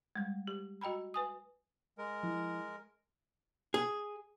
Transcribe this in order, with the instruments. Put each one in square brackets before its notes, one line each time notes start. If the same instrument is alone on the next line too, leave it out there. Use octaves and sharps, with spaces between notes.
[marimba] G3 G#3
G4
F#4 D#5 G5 A#5 B5
B4 G#5 D#6
[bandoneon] G#3 A#4
[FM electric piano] F3 E4
[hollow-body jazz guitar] G#4